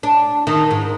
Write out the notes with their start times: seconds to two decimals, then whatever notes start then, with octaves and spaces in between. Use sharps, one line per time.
0.03 D4
0.47 D#3
0.71 G#2